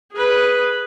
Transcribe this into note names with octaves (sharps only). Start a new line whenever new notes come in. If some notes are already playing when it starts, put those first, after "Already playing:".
G#4 B4